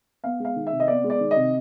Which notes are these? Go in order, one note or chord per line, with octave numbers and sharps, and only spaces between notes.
B3 F5
G#3 F5
D#3
E5
C3
D#5
B3 D5
G#3
D5
D#3
D#5
C3